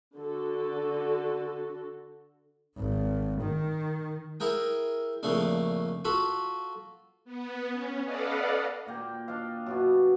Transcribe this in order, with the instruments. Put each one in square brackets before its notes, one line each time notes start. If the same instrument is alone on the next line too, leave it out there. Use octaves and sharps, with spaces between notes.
[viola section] D3 F#4 A4
[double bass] G#1
D#3
[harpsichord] E4 G#4 A#4 G5
F2 A#2 C#3 A3 D4
F4 F#4 A4 B5
[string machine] B3
C#4
A4 B4 D5 D#5 F5 F#5
[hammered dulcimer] A#2 A#3 G5
D4 D5 D#5 F5
F#2 B2 B3